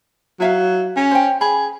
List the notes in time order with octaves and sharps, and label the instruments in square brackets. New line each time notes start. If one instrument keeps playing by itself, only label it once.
[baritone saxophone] F#3 [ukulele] E4 E5 F5
[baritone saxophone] C#4
[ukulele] C5 G5
[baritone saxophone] G#4 [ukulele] B5